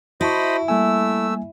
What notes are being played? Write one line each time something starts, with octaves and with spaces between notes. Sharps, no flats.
E4 F#4 C5 D#5 A5 B5 C#6
G3 A3 A#3 G#5 E6